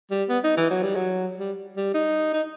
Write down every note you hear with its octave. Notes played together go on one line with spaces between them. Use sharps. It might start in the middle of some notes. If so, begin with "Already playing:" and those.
G3
B3
D#4
E3
F#3
G3
F#3
G3
G3
D#4
D#4